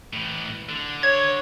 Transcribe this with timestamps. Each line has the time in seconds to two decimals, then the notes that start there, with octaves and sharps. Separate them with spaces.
0.13 A2 E3
0.69 D3
1.03 C#5 G#6